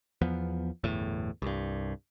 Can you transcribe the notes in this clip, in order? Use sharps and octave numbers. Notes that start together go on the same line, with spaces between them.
E2 F3 B3
G1 E2 A2
C2 G2